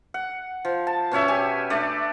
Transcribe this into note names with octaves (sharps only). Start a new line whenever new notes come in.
F#5
F3
A5
B2 C#4 C#5 E5
G4 G#5
A3 D4 D5